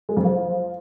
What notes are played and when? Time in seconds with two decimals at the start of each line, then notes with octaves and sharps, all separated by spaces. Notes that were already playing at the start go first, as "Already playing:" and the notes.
0.09 G#3
0.17 F2
0.24 F3